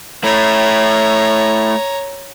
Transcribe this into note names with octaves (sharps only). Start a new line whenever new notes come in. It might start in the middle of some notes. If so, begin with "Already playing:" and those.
A3 E4 C#5 A#5